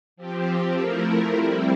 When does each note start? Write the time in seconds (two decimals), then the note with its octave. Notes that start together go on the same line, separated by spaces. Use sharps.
0.16 F3 C4 G4
0.75 F3 A3 E4 A#4
1.34 G3 C4 E4